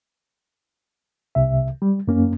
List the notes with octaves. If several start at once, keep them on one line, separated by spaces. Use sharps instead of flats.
C2 C3 E5
G3
F#2 A#3 C#4